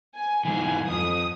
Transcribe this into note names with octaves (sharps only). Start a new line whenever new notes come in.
G#5
E3 G#3 D#4 G#5
F2 D#6